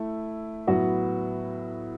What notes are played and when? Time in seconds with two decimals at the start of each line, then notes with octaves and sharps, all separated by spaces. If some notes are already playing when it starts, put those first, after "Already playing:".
Already playing: A3 E4
0.67 A2 F#3 B3 F#4 B4